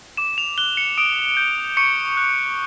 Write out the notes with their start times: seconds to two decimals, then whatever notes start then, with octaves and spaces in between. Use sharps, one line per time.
0.17 D6 E7
0.38 F7
0.58 F#6 G7
0.77 C#7
0.98 D#6 D7
1.37 G6
1.77 C#6 C#7
2.17 F#6